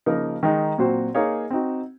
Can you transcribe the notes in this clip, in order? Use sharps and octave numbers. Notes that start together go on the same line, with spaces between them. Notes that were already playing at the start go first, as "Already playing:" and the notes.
C#3 F3 A#3 D#4 A#4
D#3 G#3 D#4
A#2 F#3 C4 F#4 C5
A#3 D#4 G#4 C#5 F5
C4 D#4 F#4